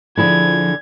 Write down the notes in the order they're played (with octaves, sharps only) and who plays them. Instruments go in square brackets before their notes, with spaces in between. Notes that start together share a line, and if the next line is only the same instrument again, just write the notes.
[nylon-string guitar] D3 E4 G#4 [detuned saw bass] F3 [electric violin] G#6